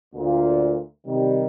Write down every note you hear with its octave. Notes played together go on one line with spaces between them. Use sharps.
D2 A#2
C3 D#3 G3